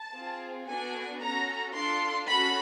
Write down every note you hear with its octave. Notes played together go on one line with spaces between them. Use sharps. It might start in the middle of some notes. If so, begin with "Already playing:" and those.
Already playing: A5
C4 F4 G#4
B3 D4 F#4 A4 G#5
C#4 F#4 A4 A#5
D4 F4 A4 C6
C#4 F#4 A4 B5